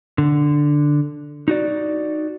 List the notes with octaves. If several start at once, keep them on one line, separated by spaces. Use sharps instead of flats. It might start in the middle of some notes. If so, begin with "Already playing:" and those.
D3
D#4 F#4 D5